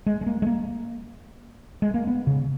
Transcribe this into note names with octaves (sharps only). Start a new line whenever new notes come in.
G#3
G#3
A#3
G#3
A#3
G#3
A#3
B3
C#3